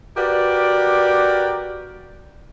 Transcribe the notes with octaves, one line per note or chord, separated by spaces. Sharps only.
F#4 G4 A#4 B4 D5